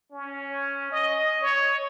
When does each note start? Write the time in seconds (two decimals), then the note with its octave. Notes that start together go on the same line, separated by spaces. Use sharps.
0.11 C#4
0.92 D#5
1.42 C#5